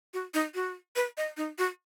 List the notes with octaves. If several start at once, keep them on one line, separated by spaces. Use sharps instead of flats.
F#4
D#4
F#4
B4
D#5
D#4
F#4